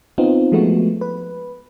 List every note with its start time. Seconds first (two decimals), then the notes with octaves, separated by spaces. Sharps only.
0.18 B3 C4 D#4 F4
0.52 F3 G#3 A3 B3 F#4
1.01 B4